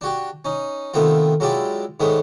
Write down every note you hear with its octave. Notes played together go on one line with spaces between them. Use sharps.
D4 F#4 G4
C#4 D#4
C3 D#3 A3 B3 C4 F4
F#3 G#3 E4 F4 G4 D5
G#2 D#3 G#3 A3 B3 C#4